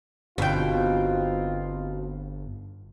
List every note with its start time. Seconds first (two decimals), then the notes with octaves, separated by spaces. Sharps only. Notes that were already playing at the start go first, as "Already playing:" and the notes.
0.38 G1 B2 C4 D#4 F4 G5